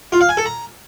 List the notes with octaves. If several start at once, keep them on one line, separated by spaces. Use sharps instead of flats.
F4
F5
G#5
A4
A#5